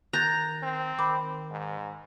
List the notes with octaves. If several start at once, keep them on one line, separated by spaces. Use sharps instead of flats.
D#3 A#5 F#6 G6 A6
C4
D#3 B5 D6
G#2